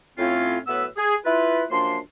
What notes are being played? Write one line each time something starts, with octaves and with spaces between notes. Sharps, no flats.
A2 C4 C#4 F4
A2 F#3 B3 B4 E5 E6
G#4
E4 F4 B4
F#2 F3 A#3 D4 C6